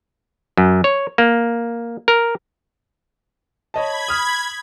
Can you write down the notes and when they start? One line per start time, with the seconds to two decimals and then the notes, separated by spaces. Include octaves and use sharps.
0.57 F#2
0.84 C#5
1.18 A#3
2.08 A#4
3.74 C#5 D#5 A5 B5 G#6
4.08 D#6 F6